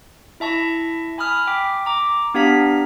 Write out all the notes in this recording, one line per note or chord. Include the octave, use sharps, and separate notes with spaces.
E4 E5 A5 C#6 A#6
G#5 B5 D#6 F6
G5 D6 B6
A#5 D6
B3 D4 G4 F5 A#5 B6